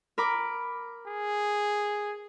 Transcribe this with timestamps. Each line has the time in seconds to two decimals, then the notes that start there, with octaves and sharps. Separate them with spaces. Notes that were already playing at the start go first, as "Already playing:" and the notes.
0.18 A#4 B5 D6
1.07 G#4